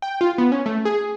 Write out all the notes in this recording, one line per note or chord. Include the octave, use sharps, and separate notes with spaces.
G5
F4
B3
C#4
A3
G#4